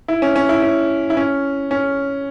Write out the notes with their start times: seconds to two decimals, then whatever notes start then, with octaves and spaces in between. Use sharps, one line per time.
0.08 E4
0.22 C#4
0.36 C#4
0.49 E4
0.62 C#4
1.10 E4
1.17 C#4
1.71 C#4